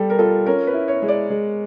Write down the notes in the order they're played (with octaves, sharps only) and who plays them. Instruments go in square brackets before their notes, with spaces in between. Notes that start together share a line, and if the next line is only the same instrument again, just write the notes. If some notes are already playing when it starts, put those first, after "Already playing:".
Already playing: [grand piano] G3 [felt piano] A4
[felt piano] A#4
[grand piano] F4 [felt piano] A4
[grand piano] C#4 [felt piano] A#4
[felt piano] B4
[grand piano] E4
[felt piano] C#5
[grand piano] G#3
[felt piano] D5
[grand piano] G#3